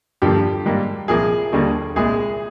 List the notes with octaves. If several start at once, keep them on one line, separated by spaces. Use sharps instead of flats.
G2 D3 F3 A#3 G4
G#2 G3 A#3
C2 A#2 F3 A#3 G#4
D#2 D3 G3 A#3
C2 A#2 G#3 G#4